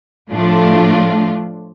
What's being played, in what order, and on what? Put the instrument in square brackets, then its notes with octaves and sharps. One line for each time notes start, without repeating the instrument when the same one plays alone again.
[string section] A2 F3 A3 D4 F4